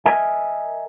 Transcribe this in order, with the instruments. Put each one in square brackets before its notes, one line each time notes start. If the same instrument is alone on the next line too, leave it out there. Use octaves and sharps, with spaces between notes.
[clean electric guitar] A#4 D#5 E5 G#5